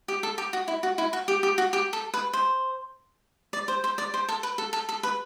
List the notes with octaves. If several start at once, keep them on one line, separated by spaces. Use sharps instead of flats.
G4
A4
G4
F#4
E4
F#4
E4
F#4
G4
G4
F#4
G4
A4
B4
C5
D5
C5
C5
D5
C5
A4
B4
A4
A4
A4
B4